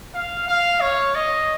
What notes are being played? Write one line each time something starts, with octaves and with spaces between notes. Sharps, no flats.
F5
F5
C#5
D#5